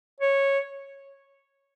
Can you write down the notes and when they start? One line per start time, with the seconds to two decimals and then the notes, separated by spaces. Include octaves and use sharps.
0.20 C#5